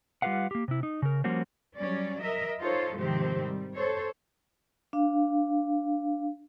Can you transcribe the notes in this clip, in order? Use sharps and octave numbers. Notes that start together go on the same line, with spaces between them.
G3 F4 G4 B4 F5 F#5
A#3 G4
C3 E4
D#4
C#3 A#4
F3 G3 A#3 C#4 F#4 C5
F#3 G3 C#4 D5
A#4 D#5 E5
D#4 F4 A4 C5 C#5
G#2 C3 D#3 F3 C4 G4
G3
A4 C5 C#5
D4 F5